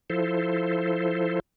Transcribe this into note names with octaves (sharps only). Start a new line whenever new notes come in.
F3 E4 A4 C5